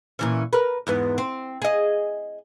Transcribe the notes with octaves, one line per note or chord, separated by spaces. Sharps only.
A#2 E3 C#4
A#4 B4
E2 G#2 B3
C4
G#4 D#5